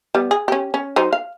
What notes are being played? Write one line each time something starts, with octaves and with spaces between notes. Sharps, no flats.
G3 B3
G#4
C#4 G4
C#4
F#3 D#4 C5
F5